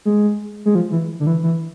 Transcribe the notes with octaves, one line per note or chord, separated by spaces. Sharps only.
G#3
G#3
F3
E3
D3
E3
E3